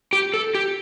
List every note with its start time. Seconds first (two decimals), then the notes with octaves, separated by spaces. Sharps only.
0.13 G4
0.34 A4
0.55 G4